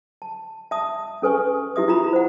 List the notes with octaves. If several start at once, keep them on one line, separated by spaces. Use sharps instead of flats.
A5
E5 A5 D#6
C#4 A4 B4 G#5 C#6
E4 G4 E5 D#6
E4 F4 A#5 B5 D#6
C5 F#5